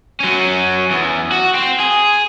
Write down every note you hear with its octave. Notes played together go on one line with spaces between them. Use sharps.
F#3 C#4
E2
F#4
C4
G#4